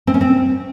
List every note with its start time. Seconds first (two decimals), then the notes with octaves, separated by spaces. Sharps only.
0.07 C4
0.14 C#4
0.21 C4